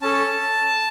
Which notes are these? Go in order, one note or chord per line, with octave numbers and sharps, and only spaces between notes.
C#4 A4 A5